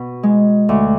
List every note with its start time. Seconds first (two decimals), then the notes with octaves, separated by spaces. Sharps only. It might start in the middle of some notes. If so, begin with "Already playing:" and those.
Already playing: B2
0.23 G#3
0.69 D2